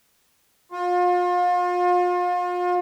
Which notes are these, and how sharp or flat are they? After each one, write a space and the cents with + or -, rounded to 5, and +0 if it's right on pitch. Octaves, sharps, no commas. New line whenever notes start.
F4 +35